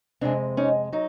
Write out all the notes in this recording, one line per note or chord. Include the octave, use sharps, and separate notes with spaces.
F2 C3 D#3 G#3 C4 D4
C#4 D#4
F#3 D#4